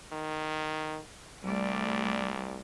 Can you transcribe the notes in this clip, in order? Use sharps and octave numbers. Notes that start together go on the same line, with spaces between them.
D#3
C2 G3 A3 D5